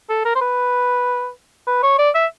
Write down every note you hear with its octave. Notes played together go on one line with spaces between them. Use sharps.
A4
A#4
C5
B4
B4
C#5
D5
E5